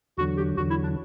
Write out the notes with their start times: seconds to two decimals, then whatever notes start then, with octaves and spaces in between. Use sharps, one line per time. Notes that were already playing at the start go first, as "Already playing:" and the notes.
0.18 E2 D3 F#3 F#4
0.37 G4
0.57 E2 F#4
0.60 D3 F#3
0.70 E4
0.83 D4